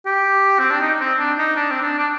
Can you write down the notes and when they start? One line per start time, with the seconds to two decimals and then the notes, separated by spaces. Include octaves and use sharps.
0.06 G4
0.59 C4
0.71 D4
0.81 D#4
1.00 C4
1.19 D4
1.38 D#4
1.56 D4
1.71 C4
1.82 D4
1.98 D4